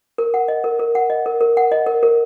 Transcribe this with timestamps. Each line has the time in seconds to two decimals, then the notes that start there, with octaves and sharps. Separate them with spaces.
0.18 A#4
0.34 F#5
0.48 D#5
0.64 A#4
0.79 A#4
0.95 F#5
1.10 D#5
1.26 A#4
1.41 A#4
1.57 F#5
1.72 D#5
1.87 A#4
2.03 A#4